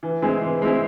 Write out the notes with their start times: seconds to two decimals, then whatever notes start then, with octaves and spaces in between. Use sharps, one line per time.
0.03 E3
0.22 G#3 C4 E4 G#4
0.42 E3
0.62 G#3 C4 E4 G#4